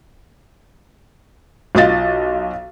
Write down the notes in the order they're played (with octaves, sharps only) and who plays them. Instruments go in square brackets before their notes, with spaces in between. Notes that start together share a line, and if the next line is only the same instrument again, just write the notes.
[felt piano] B1 F4 D#5 A6